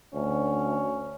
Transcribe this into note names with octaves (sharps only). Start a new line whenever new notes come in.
D2 C#4